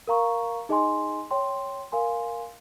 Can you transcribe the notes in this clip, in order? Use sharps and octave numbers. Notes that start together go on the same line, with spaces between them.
A#4 F5 A#5 C#6
D#4 G#4 D#5 G#5 C6
C#5 G5 C6
A#4 F5 G#5 C6